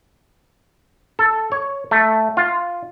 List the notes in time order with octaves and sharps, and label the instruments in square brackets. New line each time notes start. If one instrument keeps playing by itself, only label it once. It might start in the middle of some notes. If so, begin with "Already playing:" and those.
[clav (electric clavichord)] A4
C#5
A3
F4